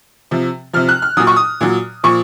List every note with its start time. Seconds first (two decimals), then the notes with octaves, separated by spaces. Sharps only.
0.31 C3 F3
0.73 C3 F3 F6
0.89 F#6
1.02 F6
1.17 A#2 F#3 D#6
1.27 C#6
1.36 D#6
1.61 A#2 F#3
2.04 A#2 F3 C#6